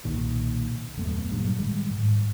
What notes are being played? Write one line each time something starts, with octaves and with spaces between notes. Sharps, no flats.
B1 A#2 D#3
D#1 F#2 A3 B3
G2 A#2 F#3
A2 D#3 G3 G#3
G#2